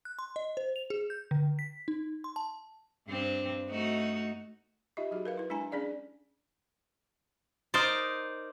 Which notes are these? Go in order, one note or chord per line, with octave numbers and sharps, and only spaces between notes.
F#6
C6
D#5
C5
F7
G#4
G6
D3
B6
D#4
C6
A5
G2 C4
A3 D#4 F#4
D#4 F4 G4 D#5 E5
F#3 D#4 F#4 G#4
A#4 B4 F5
E4 B4
G#3 D4 E4 G#5 A#5
C#4 D4 G#4 D5 F5
D#4 A#4 C5 D5